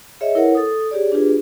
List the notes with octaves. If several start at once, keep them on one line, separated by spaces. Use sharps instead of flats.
G#4 C#5 D#5 E5
E4 A#4 B4 C#5 F#5
A4 D#6
G4 G#4 C#5 D5
D4 F4 G4 G#4 B4